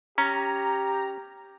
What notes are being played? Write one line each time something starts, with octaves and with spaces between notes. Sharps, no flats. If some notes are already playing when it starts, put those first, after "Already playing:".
C#4 G4 A#5